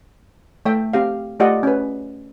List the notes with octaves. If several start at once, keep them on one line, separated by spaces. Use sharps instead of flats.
A3 E5 G5
C4 G4 F5
A3 F4 G4 D5 D#5 F#5
C#4 B4